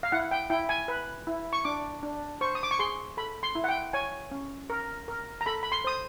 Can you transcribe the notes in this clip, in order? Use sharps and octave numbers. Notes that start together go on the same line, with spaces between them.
F5
E4 F#5
G5
E4 G5
G#5
B4
E4
C#6
D4 D6
D4
C5 C#6
D#6
D6
C#6
G#4 C6
A4 B5
C6
E4
F#5
G5
C#5 G#5
C#4
A#4
A#4
A#5
A4 B5
B5
C6
C5 D#6